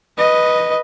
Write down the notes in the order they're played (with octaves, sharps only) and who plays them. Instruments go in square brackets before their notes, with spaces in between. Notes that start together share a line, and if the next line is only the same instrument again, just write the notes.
[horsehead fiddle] B4 D#5